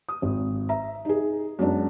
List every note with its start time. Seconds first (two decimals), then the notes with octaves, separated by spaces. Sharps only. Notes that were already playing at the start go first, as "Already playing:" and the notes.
0.09 D#6
0.22 G#1
0.69 E5 A#5
1.05 D#4 G#4
1.59 F#2 G#3 B3 D4